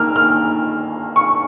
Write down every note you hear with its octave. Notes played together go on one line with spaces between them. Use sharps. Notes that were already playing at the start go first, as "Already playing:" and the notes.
Already playing: D#3 A#3 F6
F6
C#6